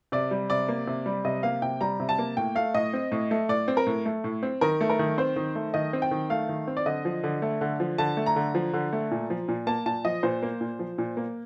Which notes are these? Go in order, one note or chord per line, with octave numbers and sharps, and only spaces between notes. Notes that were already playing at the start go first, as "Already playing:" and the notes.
C3 D5
G3
C3 D5
A#3
C3
G3
C3 D#5
A#3 F5
C3 G5
G3 A#5
C3
A5
A#3
A2 G5
A3 F5
A2 D#5
C4
A2
A3
A2 D5
C4
A#4
A2
A3
A2
C4
D#3 A#4
A3
A#4
D#3
C4 C5
D#3
A3
D#3 D#5
C4
G5
D#3
A3 F5
D#3
C4
D5
D3 D#5
F3
D3
A3
D3
F3
D3 A5
A3
A#5
D3
F3
D3
A3
A#2
F3
A#2
A#3 A5
A#2 A5
F3 D#5
A#2 C5
A#3
A#2
F3
A#2
A#3